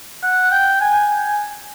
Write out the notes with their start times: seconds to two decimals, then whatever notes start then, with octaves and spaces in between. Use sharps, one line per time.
0.23 F#5
0.52 G5
0.81 G#5